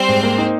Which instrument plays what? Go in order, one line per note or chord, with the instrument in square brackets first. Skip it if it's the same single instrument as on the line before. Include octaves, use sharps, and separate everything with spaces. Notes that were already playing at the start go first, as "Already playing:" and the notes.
Already playing: [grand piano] G3 [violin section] C4 C5
[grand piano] G#2
A#3
D#4